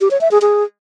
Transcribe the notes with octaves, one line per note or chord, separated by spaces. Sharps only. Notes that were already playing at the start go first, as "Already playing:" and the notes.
G4
C#5
E5
G#4
G#4